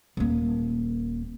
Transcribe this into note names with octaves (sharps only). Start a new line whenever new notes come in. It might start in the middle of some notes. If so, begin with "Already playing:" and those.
D#1 A#3